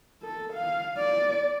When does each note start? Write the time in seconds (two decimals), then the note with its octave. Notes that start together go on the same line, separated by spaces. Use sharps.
0.23 A4
0.53 F5
0.98 D5